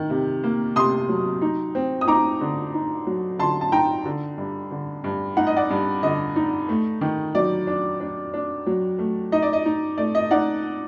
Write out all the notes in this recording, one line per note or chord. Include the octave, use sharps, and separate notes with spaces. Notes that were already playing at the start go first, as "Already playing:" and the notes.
Already playing: D#3
C3
A#3
C3 C6 D#6
F#3
D#4
C4
D#6
D#4 A#5 D6
D3
D#4
F#3
D3 A5 C6
A5
D#4 G5 A#5
D3
G2
D3
G2
D#4 F#5
D#5
D5 F#5
G2
D3 D#5
D#4
A3
D#3
F#3 D5
D4
D4
D4
F#3
A3
D#4 D#5
D5
D#5
D#4
A3 D5
D#5
D#4 D5 F#5